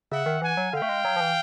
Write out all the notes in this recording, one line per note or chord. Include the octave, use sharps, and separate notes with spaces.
C#3 E5 F#5
D#3
E3 F#5 G#5
F#3
D3 F5 G5
A3
G#3
F#3
F3
E3